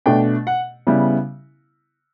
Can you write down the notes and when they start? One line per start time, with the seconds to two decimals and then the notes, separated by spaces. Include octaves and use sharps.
0.06 B2 A3 D4 G5
0.47 F#5
0.87 C#3 G3 B3 E4